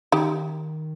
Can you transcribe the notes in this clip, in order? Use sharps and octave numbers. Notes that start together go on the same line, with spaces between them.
D#3 D#4 G4